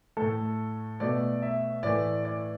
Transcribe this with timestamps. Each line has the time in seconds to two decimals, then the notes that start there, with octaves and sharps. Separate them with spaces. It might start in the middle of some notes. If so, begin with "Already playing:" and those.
0.17 A2 A3 A4
1.00 B2 A3 D5
1.42 E5
1.83 A2 E3 A3 D5
2.25 D5